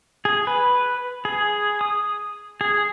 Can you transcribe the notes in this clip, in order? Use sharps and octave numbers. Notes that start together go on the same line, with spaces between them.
G#4
B4
G#4
D#6
G#4